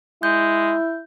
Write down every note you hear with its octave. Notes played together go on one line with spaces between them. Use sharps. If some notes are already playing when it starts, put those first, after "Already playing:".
G#3 E4 G6